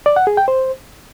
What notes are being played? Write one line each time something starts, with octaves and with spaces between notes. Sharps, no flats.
D5
F#5
G#4
G5
C5